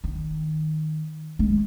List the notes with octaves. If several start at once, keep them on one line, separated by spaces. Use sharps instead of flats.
D#3
G#3 C#4